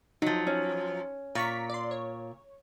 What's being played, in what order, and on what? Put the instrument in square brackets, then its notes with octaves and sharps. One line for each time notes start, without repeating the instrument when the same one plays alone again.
[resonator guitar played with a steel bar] F3 F#3 [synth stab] D#4
[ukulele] C#4
[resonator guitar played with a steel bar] A#2 [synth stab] A#5 C#6 B6
[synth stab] D5 C6
C#5